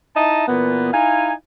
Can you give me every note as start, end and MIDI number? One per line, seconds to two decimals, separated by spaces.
0.16 0.46 63
0.16 0.46 64
0.16 0.46 75
0.16 0.46 76
0.16 0.46 81
0.48 0.90 46
0.48 0.90 52
0.48 0.90 59
0.94 1.33 63
0.94 1.33 64
0.94 1.33 77
0.94 1.33 80